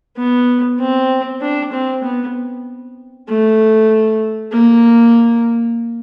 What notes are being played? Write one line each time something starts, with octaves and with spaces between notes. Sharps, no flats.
B3
C4
D4
C4
B3
A3
A#3